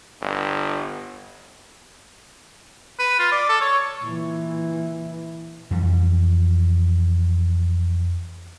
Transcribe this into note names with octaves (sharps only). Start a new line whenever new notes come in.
G1
B4
F4
D5
A4
C#5
A#2 E3
F2 E3 G3